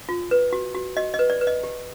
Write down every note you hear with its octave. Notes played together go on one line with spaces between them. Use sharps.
F4
B4
F#4
F#4
F#4 D#5
D#5
B4
D5
B4
D#5
G4